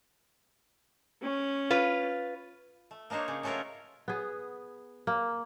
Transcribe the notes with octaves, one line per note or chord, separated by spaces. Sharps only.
C#4
F4 B4
A3
A#3 D4 D#4 C5 C#5
C#3
C#3 F#3 A3 F4 A#4 C#5
B3 G#4
A#3